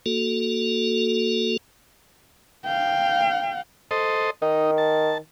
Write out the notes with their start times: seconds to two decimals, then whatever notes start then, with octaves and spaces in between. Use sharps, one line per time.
0.06 A#3 F#4 A4
2.65 F5 G5
3.91 A4 C5 D#5
4.42 D#3 D#4
4.78 A5